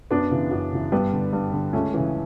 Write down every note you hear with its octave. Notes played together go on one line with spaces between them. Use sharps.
F#2 B3 D4
C#3 E3
F#2
C#3 E3
G2 G3 B3
D3
G2
D3
C#2 A3 C#4
C#3 E3